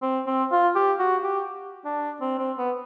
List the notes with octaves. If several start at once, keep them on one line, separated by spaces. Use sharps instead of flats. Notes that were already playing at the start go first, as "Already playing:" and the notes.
C4
C4
F4
G4
F#4
G4
D4
C4
C4
B3